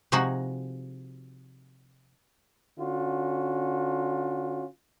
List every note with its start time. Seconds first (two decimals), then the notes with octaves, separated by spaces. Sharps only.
0.12 C3 F3 G#3 D#4 F#4
2.79 D3 C#4 F4 F#4